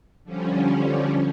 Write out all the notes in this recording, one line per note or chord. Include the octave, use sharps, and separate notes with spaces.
D3 F3 G3 C#4